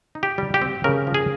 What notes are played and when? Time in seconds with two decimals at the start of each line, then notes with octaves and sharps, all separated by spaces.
0.15 D#4
0.23 G4
0.38 G3
0.54 G4
0.62 C4
0.84 C#3 A#4
1.07 F3
1.14 G#4